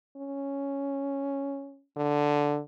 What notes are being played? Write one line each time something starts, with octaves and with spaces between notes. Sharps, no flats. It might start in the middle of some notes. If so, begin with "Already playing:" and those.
C#4
D3